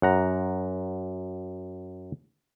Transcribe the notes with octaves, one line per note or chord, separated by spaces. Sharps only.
F#2 F#5 A#5